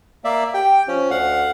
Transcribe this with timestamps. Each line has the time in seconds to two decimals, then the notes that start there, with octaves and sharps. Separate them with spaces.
0.24 A#3 D5 E5
0.54 G4 G5
0.88 F3 C#4
1.11 D2 F5 F#5